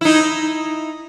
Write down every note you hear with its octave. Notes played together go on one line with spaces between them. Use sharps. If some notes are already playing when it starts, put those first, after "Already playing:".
D#4 E4